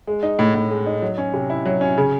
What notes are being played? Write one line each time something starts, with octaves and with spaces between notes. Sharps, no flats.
G#3
D#4
A2
A2
G#3
D#4
F#3
C#4
C3
E4
F#3
C#4
C#3